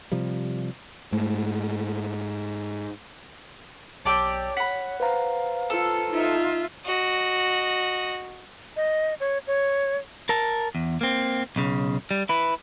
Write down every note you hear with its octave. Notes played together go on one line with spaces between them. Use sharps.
C3 F3 G3
G#2 A3
B1 G4 C#5 D5 A5 D6 E6
F#5 B5 B6
B4 C5 F5 A#5
F4 A4
D#4 F4 E5
F#4 D#5
D#5
C#5
C#5
A#4 A5
E2
A#3 C4
B1 C#3
G3
E4 B4